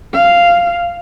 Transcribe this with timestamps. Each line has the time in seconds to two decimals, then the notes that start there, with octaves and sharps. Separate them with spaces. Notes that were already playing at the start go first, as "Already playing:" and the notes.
0.13 F5